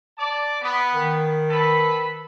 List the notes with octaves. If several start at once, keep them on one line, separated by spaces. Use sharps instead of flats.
D5 A5 D6
B3
D#3
A4 B4 B5